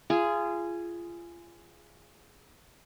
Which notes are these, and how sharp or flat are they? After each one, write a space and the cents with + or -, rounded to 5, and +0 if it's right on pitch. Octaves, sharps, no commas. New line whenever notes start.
F4 -30 G#4 +0